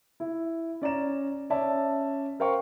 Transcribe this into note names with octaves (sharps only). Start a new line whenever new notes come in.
E4
C#4 D5 A#5 E7
C#4 C#5 D5 E5 A5
A#4 C5 F5 G5 C#6